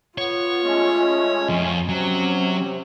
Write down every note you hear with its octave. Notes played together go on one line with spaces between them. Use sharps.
B3 F4 C#5
G#3 A3 C#4
F2
C3 F#3 C#4